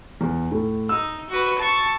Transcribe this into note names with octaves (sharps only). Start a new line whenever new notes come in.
E2
A2
D#4 E6
F#4 B4
A5 C#6